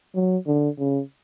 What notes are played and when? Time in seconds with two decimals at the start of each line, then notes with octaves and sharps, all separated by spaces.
0.15 F#3
0.47 D3
0.79 C#3